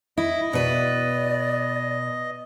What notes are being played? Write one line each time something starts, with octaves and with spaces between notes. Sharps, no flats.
E4 D#5
B2 B4 D5